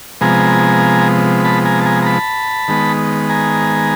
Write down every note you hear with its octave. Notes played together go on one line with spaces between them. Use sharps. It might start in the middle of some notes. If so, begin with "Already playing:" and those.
C3 F3 G#3 B3 G#5 A#5
A5 B5
G#5 A#5
A5
G#5 A#5
A#5
A5 B5
D#3 G#3 B3
G#5 A#5